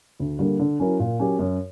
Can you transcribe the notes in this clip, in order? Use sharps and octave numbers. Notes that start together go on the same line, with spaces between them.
D2
D3 G3 A#3
D3
F#3 C#4 E4 A#4
A#2
F#3 C#4 G4 A#4
F#2